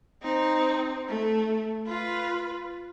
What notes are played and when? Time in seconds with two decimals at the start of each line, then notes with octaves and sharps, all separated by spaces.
0.23 C4 D#4
1.09 A3
1.87 F4 B4